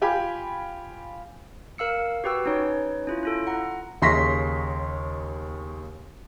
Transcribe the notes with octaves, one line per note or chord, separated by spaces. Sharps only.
F4 G4 G5 G#5 B5
A#4 F5 E6 C#7
F#4 G4 B4 G5 E6
C#4 D#4 B4 C#5
C#4 E4 F4
E4 F4 A4
F#5 A#5
D#2 C#3 C6 C#6 A#6 B6